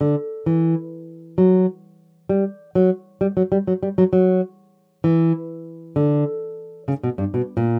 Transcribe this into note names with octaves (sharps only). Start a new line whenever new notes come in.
D3
E3
F#3
G3
F#3
G3
F#3
G3
F#3
G3
F#3
F#3
E3
D3
C#3
B2
G2
B2
A#2